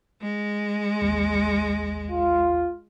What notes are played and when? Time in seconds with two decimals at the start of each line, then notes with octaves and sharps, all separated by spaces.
0.21 G#3
1.02 A1 D#2
2.09 F4